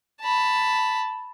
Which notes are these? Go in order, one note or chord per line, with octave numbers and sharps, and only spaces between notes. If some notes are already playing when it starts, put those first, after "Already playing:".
A5 B5